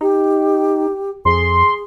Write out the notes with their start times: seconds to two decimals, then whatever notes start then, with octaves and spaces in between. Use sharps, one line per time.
0.01 D#4 G4
1.25 F2 G#4 C6